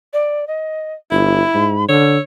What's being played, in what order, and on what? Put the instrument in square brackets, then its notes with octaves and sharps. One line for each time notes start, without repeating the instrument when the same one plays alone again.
[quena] D5
D#5
[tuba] G1 [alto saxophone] E4 [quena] B5
[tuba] G#2
[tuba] D3 [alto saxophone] C#5 [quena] E6